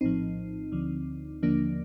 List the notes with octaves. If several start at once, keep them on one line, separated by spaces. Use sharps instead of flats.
A#1 A2 F3 C4 D#4
D2 D3 F3
D#2 D3 F3 A#3 D4